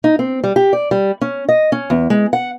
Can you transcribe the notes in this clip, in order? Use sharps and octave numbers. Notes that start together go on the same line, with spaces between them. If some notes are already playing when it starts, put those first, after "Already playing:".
D#4
C4
G3
G4
D5
G3
C#4
D#5
C#4
E2
G#3
F#5